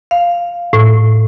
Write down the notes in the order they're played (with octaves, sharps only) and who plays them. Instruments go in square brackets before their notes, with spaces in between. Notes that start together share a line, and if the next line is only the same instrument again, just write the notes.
[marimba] F5
A2